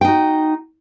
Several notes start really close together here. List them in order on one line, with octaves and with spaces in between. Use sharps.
G5 D#4 F#4